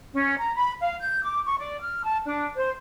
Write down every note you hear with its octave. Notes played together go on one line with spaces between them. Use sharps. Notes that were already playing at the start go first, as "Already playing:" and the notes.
C#4
A#5
B5
F5
G6
D6
C#6
D5
F6
A5
D4
C5